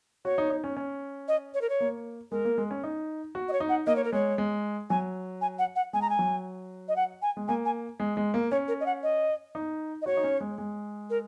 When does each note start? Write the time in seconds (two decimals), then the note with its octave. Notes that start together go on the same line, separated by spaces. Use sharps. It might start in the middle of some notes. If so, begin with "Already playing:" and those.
0.25 F#4 C#5
0.38 D#4
0.50 D#4
0.64 C#4
0.77 C#4
1.28 D#5
1.54 C#5
1.61 A#4
1.69 C#5
1.80 A#3
2.31 G#3 A#4
2.45 A#3
2.58 G#3
2.71 C#4
2.83 D#4
3.35 F#4
3.49 D#5
3.53 C#5
3.60 D#4
3.69 F#5
3.87 A#3 D#5
3.96 C#5
4.04 A#4
4.12 G#3 C#5
4.38 G#3
4.90 F#3 G#5
5.41 G#5
5.59 F#5
5.76 F#5
5.93 G#3 G#5
6.02 A#5
6.10 G#5
6.19 F#3
6.88 D#5
6.96 F#5
7.22 G#5
7.37 G#3
7.48 A#3 G#5
7.65 G#5
8.00 G#3
8.17 G#3
8.34 A#3
8.51 C#4 C#5
8.68 A#4
8.80 D#5
8.86 F#5
9.03 D#5
9.55 D#4
10.02 D#5
10.06 F#4 C#5
10.17 D#4
10.24 C#4
10.40 G#3
10.58 G#3
11.10 A#4